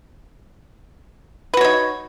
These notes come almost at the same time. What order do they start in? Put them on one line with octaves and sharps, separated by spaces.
B4 F#4 C#5 D#4